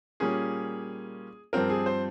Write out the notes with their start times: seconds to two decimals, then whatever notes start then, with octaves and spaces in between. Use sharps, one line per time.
0.20 A#2 G3 A#3 C#4 G#4
1.53 G2 F3 C4 A#4
1.69 G#4
1.86 C5